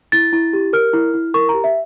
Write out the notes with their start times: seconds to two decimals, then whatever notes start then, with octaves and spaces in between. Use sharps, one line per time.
0.12 E4 A6
0.33 E4
0.53 G4
0.73 A#4 F6
0.93 E4
1.14 E4
1.34 A#4 C#6
1.49 G4 A#5
1.64 E5